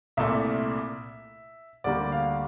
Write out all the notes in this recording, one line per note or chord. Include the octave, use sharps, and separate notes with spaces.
C2 A#2 A3 E5
D2 D3 G3 A#3 D5
F5